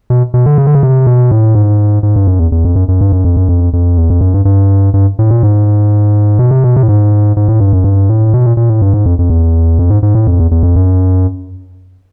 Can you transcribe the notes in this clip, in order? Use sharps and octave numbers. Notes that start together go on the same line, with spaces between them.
B2
B2
D3
C#3
D3
C#3
C3
B2
A2
G#2
G#2
G2
F#2
E2
E2
F2
F#2
F#2
G2
F#2
F2
F#2
F2
F2
E2
F2
F#2
G2
G2
G2
A2
A#2
G#2
B2
C3
B2
C3
A2
G#2
G#2
A2
G2
F#2
G2
A2
B2
A#2
A#2
A2
G2
G#2
F2
F2
E2
F2
G#2
G#2
A2
F2
E2
E2
F2
F#2